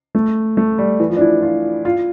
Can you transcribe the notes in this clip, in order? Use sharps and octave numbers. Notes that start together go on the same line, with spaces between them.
A3
A3
G3
E3
F3
D4
E4
F4
F4